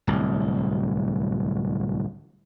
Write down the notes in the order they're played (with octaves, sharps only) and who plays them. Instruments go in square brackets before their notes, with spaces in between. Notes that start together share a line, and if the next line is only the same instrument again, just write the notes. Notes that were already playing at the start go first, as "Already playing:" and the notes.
[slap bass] D1 C2